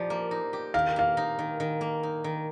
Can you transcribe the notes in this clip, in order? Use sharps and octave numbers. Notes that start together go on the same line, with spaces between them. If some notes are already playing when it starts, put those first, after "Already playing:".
Already playing: F3 D#4 G4 D5
A#3
D#4
G4
D#3 F5
A#3 F5
D#4
D#3
D#3
A#3
D#4
D#3